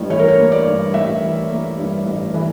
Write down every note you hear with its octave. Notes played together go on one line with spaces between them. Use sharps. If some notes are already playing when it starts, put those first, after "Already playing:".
Already playing: A1 G2
E3 C#5
A#4
C#5
A#3
D5
G2
A1 E5
E3
A#3
G2
A1
E3